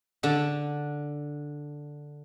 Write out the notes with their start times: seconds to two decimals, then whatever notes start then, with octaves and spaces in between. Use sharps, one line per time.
0.23 D3 A5